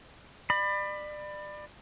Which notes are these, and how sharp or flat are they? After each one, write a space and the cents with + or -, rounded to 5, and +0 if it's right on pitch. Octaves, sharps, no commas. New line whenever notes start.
D5 +30 B5 +10